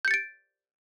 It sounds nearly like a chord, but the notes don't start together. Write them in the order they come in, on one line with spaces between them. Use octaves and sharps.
G6 C#7 A6 D7